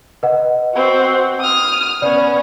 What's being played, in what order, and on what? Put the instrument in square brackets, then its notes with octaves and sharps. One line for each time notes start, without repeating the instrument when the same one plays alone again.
[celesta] B4 D#5 F#5
[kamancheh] C4 F#4
D#6 F6
[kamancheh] B3 C#4 [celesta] D5